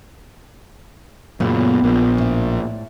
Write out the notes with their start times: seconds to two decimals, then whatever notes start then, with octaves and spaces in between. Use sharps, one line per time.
1.40 F#2 A#2 C#3 B3
1.83 A#1 A#2
2.18 A2 D5